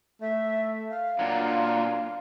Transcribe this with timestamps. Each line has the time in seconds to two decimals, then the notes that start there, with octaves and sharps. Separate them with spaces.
0.21 A3 E5
0.90 F5
1.19 A#2 F#3 D4